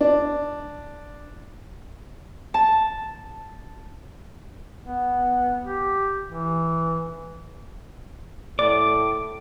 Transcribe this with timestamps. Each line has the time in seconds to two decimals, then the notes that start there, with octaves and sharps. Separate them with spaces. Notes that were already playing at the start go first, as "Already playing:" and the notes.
0.01 D4
2.54 A5
4.83 B3
5.65 G4
6.28 E3
8.59 A2 D5 D6